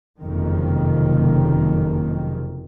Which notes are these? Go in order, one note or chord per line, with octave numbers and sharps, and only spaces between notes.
F#1 F2 C3 D#3